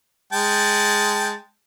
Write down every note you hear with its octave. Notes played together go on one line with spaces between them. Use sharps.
G#3 G5 A5